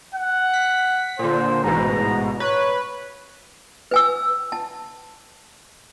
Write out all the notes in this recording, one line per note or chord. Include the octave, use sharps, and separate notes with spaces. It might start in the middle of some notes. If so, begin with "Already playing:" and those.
F#5
B6
A#2 D3 C5
A1 G#2 B2 A#5
B4 C#5
B4 G#5 E6
A5